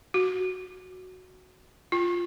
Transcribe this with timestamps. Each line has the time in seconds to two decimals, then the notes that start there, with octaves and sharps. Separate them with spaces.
0.14 F#4
1.92 F4